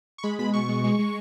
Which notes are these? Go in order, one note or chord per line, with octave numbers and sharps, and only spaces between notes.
C#6
G#3 B5
B2 B5
B2 C#6
G#3
G#3
G#3